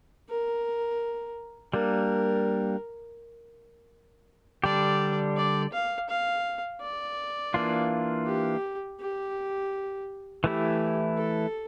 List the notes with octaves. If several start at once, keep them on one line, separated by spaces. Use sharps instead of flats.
A#4
G3 A#3 D4 A#4
D3 G3 D4 G4 D5
D5
F5
F5
D5
E3 A#3 D4 F4
G4
G4
E3 A3 E4 G4
A4